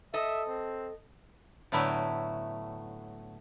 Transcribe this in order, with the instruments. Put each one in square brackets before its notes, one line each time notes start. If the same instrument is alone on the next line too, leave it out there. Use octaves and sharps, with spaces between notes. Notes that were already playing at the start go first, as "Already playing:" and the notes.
[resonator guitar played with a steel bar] A4 D#5 [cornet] E5
[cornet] C4
[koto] A2 D3 F#3 A3 B3 E4